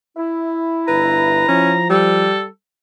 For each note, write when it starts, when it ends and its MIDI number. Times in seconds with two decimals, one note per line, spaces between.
0.16 1.93 64
0.88 1.47 31
0.88 1.44 71
0.88 1.89 82
1.48 2.29 53
1.48 1.74 61
1.90 2.47 55
1.90 2.45 69